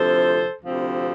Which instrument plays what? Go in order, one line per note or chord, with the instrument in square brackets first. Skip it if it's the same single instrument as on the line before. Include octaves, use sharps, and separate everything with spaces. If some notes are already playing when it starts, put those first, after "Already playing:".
Already playing: [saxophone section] D2 C3 F3 C4 A4 C5
D2 C3 F3 C4